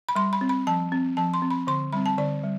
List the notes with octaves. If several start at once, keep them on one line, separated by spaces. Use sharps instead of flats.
B5
G3 C6
B5
C4
B5
F3 A5
C4
F3 A5
C6
C4
B5
D3 C6
G3 C4 B5
A5
D3 D5
G3